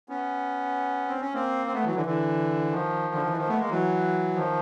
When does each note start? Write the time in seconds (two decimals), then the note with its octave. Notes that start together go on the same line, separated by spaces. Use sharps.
0.09 B3 C#4
1.08 C4
1.21 C#4
1.33 A#3 C4
1.67 C4
1.73 A3 B3
1.84 E3 F#3
1.95 D3 E3
2.06 D3 E3
2.71 D#3 F3
3.14 D3
3.21 D#3
3.30 E3
3.37 D#3 F3
3.48 A3 B3
3.59 G#3 A#3
3.70 E3 F#3
4.35 D#3 F3